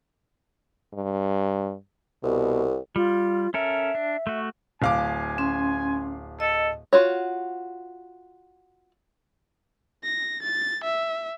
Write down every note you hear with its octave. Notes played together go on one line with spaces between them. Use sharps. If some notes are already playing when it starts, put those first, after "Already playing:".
G2
C2 B2
G3 F4
C#4 A4 A#4 E5
D4
A3 F#4
D1 F5 G#5 D6
C#4 C6
A4 D#5
F4 F#4 C#5
A#6
A6
E5